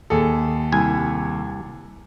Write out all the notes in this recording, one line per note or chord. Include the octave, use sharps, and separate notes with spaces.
D#2 G#4 A4
C2 G#5